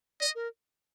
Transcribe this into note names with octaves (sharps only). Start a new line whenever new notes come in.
D5 D#5
A#4